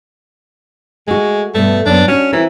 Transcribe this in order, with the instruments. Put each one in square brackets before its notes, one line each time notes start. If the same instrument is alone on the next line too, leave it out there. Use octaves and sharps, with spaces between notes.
[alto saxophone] G#3 [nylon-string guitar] A3 F#4
[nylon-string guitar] G2 B2 [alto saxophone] A3
[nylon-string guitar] F#2 B3 [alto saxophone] D4
[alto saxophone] C#4 [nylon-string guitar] D4 F#4
[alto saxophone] E3 [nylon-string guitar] C4 F#4 A#4